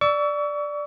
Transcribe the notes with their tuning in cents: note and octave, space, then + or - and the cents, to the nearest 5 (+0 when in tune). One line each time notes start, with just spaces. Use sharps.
D5 +0 C#6 +40 E6 +0